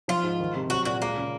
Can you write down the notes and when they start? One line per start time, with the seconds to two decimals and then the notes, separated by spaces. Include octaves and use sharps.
0.08 F3 F4
0.23 G#2
0.40 D#3
0.55 C3
0.70 F#3 F#4
0.85 A#2 F#4
1.02 G#3 A#3
1.17 C#3